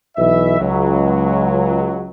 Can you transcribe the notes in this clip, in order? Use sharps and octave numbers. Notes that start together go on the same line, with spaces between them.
B1 E3 D#5 E5
C#2 F#3